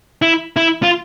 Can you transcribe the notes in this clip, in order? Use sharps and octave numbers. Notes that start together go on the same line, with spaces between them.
E4
E4
F4